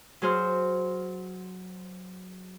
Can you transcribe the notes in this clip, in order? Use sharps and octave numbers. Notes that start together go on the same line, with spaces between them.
F#3 G#4 C5 F6